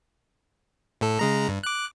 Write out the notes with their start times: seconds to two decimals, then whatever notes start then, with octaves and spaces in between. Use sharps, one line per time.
1.01 A2 A4
1.19 C#3 G#3 A#5
1.49 G2
1.63 D6 F#6